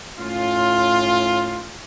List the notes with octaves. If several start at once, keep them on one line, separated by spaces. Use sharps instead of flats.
A2 C#4 F4